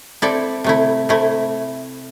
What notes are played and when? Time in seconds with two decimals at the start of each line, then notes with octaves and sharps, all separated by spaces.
0.22 C4 E4 A4 D5
0.64 C3 A3 E4
1.09 C3 A3 E4